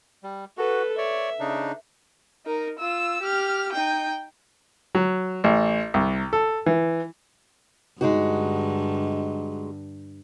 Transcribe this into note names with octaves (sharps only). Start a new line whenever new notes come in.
G3
F#4 A4 B4
C#5 D5 E5
C#3 D4 D#4
D#4 A#4
F4 E6
G4 F6
D#4 G5
F#3
A1
C2
A4
E3
G2 D3 G#3 D#4 F#4